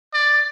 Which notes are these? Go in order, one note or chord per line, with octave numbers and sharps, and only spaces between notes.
D5